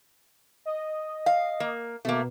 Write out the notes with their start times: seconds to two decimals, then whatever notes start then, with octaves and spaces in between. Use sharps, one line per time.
0.66 D#5
1.26 F5
1.60 A#3
2.05 B2 A3 A#3